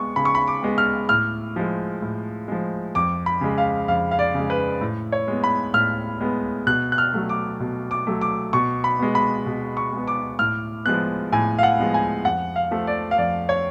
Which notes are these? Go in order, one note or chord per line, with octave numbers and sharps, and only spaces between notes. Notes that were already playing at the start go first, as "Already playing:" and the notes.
Already playing: G#3 B3 C#6
C#3 B5
C#6
B5
D6
G#3 B3
F6
A2 F6
F3 G#3
A2
F3 G#3
F2 D6
B5
C#3 G#3
F5
F2 F5
F5
D5
C#3
G#3
B4
A2
C#5
G#3 B3
B5
A2 F6
G#3 B3
B2 F#6
F#6
F6
F#3 A3
D6
B2
D6
F#3 A3
D6
B2 C#6
B5
G#3 B3
B5
B2
C#6
G#3 B3
D6
A2 F6
F3 G#3 B3 F#6
A2 G#5
F5
F#5
F3 G#3 B3
G#5
F2 F#5
F5
F3 A3
D5
F5
F2 D5
C#5